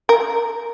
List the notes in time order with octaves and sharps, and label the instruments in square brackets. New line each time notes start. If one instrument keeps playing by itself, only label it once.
[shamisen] A#4